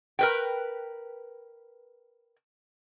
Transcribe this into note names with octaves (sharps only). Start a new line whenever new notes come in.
A#4 B4 G5